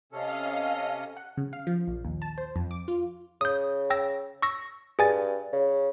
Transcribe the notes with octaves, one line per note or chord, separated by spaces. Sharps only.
C3 C#4 A4 D#5 F5
F#5
C#3
F5
F3
A#1
D#2
A5
C5
F2
D6
F4
C#3 D#6 G6
G5 E6 A#6
C#6 E6 A#6
G2 G#4 G#5 A6
C#3